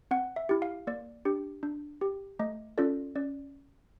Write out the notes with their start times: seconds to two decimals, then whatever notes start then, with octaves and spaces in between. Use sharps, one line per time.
0.11 C4 F#5
0.36 E5
0.49 E4 G4
0.62 F5
0.87 A#3 D5
1.25 D4 G4
1.63 D4
2.01 G4
2.39 A3 D#5
2.78 C#4 F4 A4 D5
3.15 C#4 D5